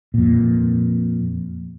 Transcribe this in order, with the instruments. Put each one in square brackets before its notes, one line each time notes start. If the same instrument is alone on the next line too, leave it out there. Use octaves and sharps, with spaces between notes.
[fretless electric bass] F2 A#2